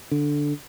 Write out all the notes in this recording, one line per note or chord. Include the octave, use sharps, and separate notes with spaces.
D3